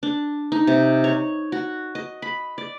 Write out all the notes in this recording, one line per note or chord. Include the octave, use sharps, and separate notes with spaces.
D4
D#4
C3
C#5
F#4
D#5
B5
D5